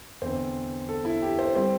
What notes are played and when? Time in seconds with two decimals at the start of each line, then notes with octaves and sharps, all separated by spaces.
0.22 E2 D3 C4 C5
0.89 A4
1.05 E4
1.22 G4
1.39 C5
1.55 G3 C4 C5